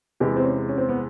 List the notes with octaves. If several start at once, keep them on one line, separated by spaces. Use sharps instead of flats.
E2 C3 E3 G#3 G4
C4
C#4
C#4
C4
B3